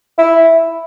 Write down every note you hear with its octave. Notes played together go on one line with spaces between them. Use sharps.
E4